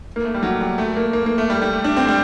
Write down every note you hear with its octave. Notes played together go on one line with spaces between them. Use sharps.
A#3
A3
G3
F#3
G3
A3
A#3
A#3
A#3
A3
G3
G3
A3
D4
C4
G3